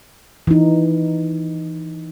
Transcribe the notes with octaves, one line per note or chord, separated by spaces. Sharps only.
E3 D#4